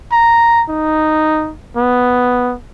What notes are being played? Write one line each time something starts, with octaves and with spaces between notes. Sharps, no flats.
A#5
D#4
B3